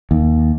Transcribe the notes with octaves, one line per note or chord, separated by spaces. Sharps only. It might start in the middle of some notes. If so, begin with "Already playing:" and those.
D#2